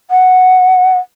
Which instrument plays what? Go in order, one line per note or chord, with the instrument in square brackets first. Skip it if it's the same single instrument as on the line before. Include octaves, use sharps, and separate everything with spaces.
[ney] F#5